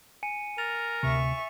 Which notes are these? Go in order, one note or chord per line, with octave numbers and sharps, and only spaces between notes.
G#5 C#7 D#7
A#4 A6 F7
D2 C3 E5 C#6